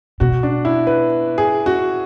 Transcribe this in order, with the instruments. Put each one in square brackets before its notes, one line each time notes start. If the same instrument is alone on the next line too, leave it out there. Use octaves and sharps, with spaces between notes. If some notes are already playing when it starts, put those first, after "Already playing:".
[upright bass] B2 [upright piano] F#4
[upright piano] D4
E4
B4
G#4
F#4